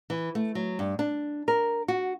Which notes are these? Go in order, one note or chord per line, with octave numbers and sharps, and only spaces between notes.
E3
A3
F#3
G2
D4
A#4
F#4